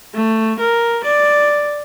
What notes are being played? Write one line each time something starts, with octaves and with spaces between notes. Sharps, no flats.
A3
A#4
D5